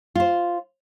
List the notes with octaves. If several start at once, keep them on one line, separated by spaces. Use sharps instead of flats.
F4 C5